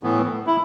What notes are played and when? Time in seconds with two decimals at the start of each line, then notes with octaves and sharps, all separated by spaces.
0.03 A2 E3 B3
0.47 E4